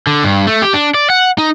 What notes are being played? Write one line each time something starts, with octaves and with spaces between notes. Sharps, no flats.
D3
G2
A3
G4
D4
D5
F#5
D#4